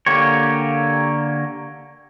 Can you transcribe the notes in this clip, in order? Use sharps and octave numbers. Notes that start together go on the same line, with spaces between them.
D3 A#3 G4 C#5